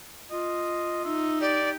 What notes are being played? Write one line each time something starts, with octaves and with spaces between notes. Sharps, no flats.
F4 D#5
D#4 E5
G4 D5